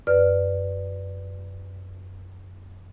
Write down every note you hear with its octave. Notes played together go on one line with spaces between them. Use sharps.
F#2 B4 D5 F6